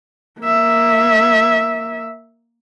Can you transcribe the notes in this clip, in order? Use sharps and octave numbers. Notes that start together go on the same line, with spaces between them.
A#3 E5